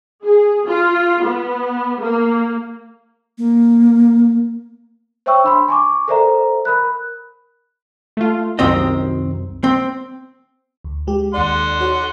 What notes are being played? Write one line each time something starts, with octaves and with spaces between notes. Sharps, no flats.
G#4
F4
B3
A#3
A#3
C5 C#5 E5 G5 C#6 E6
D4 B5 C6
G#5 C#6 D6
A4 A#4 C5 D5 E5 A#5
A#4 B5 F#6
A3 F4
C2 F#2 D#3 C4 D#5
C4
D2
G#3 G4
D#2 D5 F#5 C6
F#4 C#5